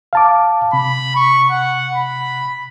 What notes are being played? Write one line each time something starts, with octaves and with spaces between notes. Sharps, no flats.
F5 A5 D6
C3 B5
C#6
F#5
B5